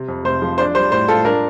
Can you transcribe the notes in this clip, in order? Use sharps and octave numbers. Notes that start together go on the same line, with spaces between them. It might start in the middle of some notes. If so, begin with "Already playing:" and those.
Already playing: C3
F2
F1 C5
F3
D4 C5
G3 C5
A2 C5
F4 A4
D4 A#4